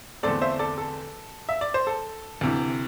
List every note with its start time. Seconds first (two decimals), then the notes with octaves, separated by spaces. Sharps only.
0.23 E2 D3 A3 C4 A4 D5
0.42 C5 E5
0.59 A4 D5
0.78 A4
1.49 E5
1.61 D5
1.74 C5
1.87 A4
2.41 D2 C3 E3